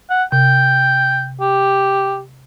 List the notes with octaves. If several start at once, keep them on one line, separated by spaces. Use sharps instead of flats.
F#5
C3 G5
G4